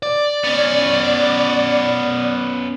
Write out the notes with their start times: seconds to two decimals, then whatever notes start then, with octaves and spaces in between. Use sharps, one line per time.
0.03 D5
0.44 B3 C#4